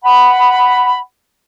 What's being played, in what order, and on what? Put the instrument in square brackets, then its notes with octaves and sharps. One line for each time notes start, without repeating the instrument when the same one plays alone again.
[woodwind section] F#5 B5